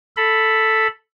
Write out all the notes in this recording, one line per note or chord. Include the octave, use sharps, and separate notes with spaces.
A4 B5